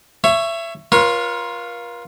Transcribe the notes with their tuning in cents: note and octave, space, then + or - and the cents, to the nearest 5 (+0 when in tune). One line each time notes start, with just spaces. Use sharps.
C#5 +0 E5 +25
F4 +0 A#4 +45 C#5 -10